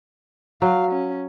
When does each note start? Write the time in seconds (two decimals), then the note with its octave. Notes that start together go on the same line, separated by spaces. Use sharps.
0.62 F#3 F5
0.92 C#4